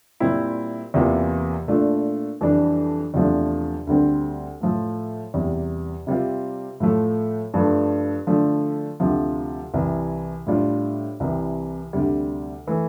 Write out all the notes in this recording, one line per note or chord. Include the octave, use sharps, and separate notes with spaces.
A#2 G3 C4 E4
E2 C3 E3 A#3 F4
A#2 A3 D4 F4
F2 E3 G3 D4
E2 C3 F3 A3 D4
D2 D3 G3 C4
A2 F3 A3
E2 C3 G3
C3 G3 C4 F4
A2 F3 A3
G2 F3 A3
D3 F3 A3
D2 C3 F3
C2 C3 E3
A2 G3 D4 F4
C2 C3 E3
D2 C3 G3
E3 A3